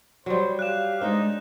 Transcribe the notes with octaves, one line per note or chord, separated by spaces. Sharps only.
F#3 G3 C5
G4 F5 F#6 E7
G#3 D4 D#4 C5